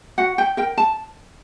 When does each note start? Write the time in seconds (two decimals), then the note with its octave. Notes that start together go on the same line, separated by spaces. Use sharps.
0.18 F#4 F#5
0.38 G5
0.57 A#4 G5
0.78 A5